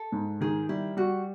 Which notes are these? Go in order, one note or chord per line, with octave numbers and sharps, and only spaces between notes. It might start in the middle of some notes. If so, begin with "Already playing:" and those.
Already playing: A4
G#2
D#3 G#4
G3 E4
G3 F#4